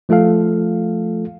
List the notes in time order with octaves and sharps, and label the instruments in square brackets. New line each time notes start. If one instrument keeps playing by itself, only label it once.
[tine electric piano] F3 A3 F4 A4 F5